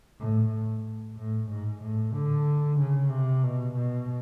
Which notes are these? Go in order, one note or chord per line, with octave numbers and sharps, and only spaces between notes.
A2
A2
G#2
A2
D3
C#3
C3
B2
B2